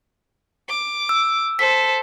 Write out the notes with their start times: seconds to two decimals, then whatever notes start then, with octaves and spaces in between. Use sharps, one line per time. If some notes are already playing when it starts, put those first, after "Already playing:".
0.69 D6
1.09 E6
1.59 A4 C5 B6